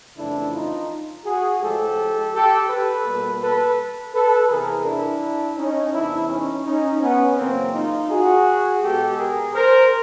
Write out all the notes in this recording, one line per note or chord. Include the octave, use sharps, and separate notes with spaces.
F2 C#3 E3 A3 D4 E4
D#4 F4
F#4 G#4
A2 F3 G#3 G4 A4
G4 A4
A4 B4
B2 G3 A#3
A4 B4
A4 B4
E2 C3 E3 G#4 A#4
D4 E4
C#4 D#4
E2 C3 E3 D4 E4
C#4 D#4
C#4 D#4
B3 C#4
F#2 C#3 E3 A#3 C4
D#4 F4
F#4 G#4
B2 G#3 G4 A4
G#4 A#4
A#4 C5